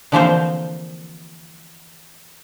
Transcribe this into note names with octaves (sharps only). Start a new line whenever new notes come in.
D3 E3 F3 A#3 C4 C5